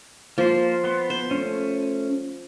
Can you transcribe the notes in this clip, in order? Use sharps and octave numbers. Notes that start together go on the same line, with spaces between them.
F3 A#3 C5
B3 C6
C5
A3 C#4